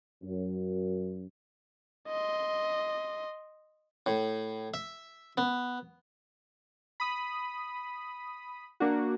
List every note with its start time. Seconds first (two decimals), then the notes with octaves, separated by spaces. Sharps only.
0.23 F#2
2.08 D#5 C6
4.06 A2
4.74 E5
5.38 B3
7.00 B5 D#6
8.80 A#3 D4 F#4